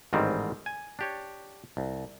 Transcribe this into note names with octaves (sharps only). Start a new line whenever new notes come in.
A1 G#2 D#3 G3 C4
G#5
D4 G4 C#5
C2